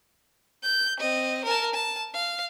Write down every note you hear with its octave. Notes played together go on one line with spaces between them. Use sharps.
G6
C4 D#5
A#4 A5
A5
F5